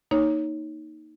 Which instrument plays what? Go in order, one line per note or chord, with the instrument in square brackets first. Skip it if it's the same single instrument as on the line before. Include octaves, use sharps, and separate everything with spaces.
[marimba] A#3 D#4 C#5